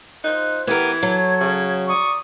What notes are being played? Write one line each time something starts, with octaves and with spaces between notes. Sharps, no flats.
D#4 F4 C5 F#6
E3 B3 G4 A#4 G#6
F#3 A4 C#5
C#3
D5 A#5 C#6 D#6